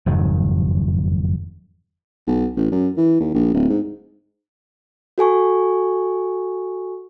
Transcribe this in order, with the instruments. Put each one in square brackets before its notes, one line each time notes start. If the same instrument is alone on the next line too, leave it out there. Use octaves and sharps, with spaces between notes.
[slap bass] F#1 F2 G#2 D#3
[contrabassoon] B1
A1
F#2
E3
D#2
A#1
D1
G#2
[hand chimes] F#4 A4 G#5 C#6